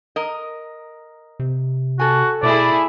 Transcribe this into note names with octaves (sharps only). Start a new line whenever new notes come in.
A#4 D#5
C3
F#4 A4 G#5
B2 A3 E4 G#4 D5